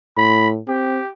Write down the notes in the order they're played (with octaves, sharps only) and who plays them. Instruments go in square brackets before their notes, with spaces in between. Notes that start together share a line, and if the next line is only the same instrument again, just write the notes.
[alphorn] A2 [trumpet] B5
[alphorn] C4 [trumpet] G4